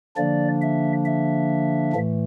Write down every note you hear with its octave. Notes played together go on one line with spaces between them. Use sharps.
D3 F3 A#3 D4 D5
E5
E5
A2 E3 A3